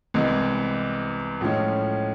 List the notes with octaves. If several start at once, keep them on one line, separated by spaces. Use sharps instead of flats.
C2 C3 E3 G#3 B3
A2 F3 G#3 C#4